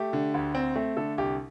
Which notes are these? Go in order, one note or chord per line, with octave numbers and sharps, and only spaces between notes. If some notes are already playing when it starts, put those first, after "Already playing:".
Already playing: A3 G4
D3
D2
C4
A3 C4
D3 A4
C2 G4